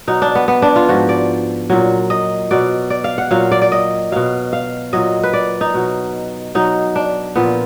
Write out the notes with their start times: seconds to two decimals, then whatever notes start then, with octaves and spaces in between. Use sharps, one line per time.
0.07 B2 F#3 D#4
0.22 D4
0.35 B3
0.48 B3
0.62 D4
0.76 F4
0.89 G#2 F3 F#4
1.09 D5
1.70 A#2 F#3
2.10 D#5
2.51 B2 F#3 D5
2.90 D5
3.04 F5
3.18 F#5
3.31 A#2 F#3 F5
3.52 D5
3.62 D5
3.72 D#5
4.12 B2 F#3 F5
4.53 F5
4.93 A#2 F#3 D#5
5.23 B4
5.33 D5
5.61 D#4
5.74 B2 F#3
6.55 B2 F#3 D#4
6.96 D4
7.36 A#2 F3 B3